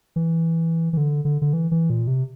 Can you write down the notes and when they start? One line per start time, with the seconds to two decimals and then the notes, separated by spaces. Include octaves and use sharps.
0.16 E3
0.93 E3
0.97 D3
1.25 D3
1.42 D3
1.53 E3
1.71 E3
1.90 A#2
2.07 C3